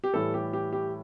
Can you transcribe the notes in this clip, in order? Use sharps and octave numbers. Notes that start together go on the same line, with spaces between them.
G4
A2 E3 G3 A4
G4
G4
G4